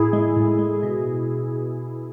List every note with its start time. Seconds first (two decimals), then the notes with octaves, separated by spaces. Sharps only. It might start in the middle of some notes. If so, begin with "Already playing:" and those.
Already playing: A2 E4 G#4
0.13 G#3
0.37 A2
0.59 G#3
0.83 B2